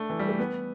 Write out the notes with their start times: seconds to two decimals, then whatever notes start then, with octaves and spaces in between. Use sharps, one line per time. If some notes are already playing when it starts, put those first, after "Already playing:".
Already playing: A3 D4
0.10 E3
0.19 G3
0.29 A3
0.39 B3